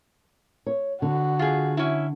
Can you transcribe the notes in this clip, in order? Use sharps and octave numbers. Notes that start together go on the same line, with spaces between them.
C#5
D3 F#4
F4 G#4
C#4 E4